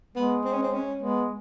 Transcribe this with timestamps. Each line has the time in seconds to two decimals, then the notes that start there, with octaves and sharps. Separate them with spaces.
0.15 G#3 B3
0.44 C4
0.54 C#4
0.63 C4
0.74 C#4
1.02 G#3 B3